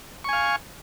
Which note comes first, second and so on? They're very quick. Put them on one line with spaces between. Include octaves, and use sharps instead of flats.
C#6 G#5 F5